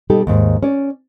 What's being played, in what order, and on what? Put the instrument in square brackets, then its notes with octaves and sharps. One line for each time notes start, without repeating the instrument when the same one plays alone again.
[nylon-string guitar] B2 G3 D#4 G4 A4
D#2 G#2
C#4 D5